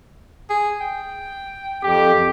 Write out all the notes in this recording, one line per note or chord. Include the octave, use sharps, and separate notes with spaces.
G#4
G5
F2 G4